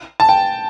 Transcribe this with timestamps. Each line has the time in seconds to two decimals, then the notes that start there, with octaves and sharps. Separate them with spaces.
0.20 A5
0.29 G5